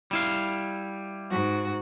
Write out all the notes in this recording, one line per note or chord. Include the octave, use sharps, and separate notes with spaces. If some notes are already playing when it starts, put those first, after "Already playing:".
G3 E4 F5
G#2 F#4